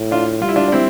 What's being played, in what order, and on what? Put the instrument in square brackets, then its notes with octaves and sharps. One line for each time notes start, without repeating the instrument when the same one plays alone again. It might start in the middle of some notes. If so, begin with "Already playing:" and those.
Already playing: [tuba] A2
[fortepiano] D4 F4
[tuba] G3 [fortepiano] F4
[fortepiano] E4
D4 F4
D4
C4 E4